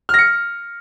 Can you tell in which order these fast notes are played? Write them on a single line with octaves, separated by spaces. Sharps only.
F6 A#6 C#7